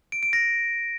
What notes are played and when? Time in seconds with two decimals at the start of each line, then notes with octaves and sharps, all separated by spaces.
0.12 D7
0.23 D7
0.33 A#6